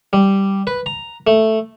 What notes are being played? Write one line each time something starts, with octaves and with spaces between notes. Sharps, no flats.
G3
B4
A#5
A3